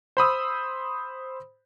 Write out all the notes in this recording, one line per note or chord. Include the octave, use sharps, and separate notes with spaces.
C5 B5 D#6 E6